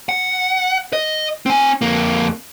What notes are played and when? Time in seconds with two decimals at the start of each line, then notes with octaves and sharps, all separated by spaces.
0.09 F#5
0.93 D#5
1.46 C4 G#5
1.82 F2 A#3